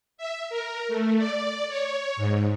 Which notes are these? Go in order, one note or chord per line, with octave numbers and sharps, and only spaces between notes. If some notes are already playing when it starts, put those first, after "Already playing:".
E5
A#4
A3
D5
C#5
G#2